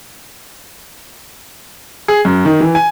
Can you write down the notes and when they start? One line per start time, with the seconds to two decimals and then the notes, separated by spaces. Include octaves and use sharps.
2.08 G#4
2.25 F#2
2.45 D#3
2.60 E3
2.75 G#5